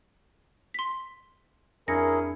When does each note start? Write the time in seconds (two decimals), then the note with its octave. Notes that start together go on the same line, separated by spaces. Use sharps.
0.74 C6 B6
1.88 F2 C#4 D4 E4 G#4 A#4 A#6 C#7